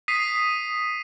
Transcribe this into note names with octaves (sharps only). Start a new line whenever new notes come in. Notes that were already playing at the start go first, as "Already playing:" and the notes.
D#6 B6 C7 D#7